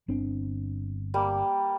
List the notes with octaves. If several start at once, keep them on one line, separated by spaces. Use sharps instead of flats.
G1 C4 D4
G3 A#3